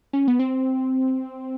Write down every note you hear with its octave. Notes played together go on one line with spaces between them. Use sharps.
C#4
B3
C4